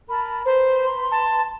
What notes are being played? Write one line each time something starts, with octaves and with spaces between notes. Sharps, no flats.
A#4 A5 B5
B4 C5 A#5 C6
A5